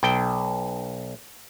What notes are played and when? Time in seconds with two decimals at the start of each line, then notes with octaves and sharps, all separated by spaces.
0.03 B1 G5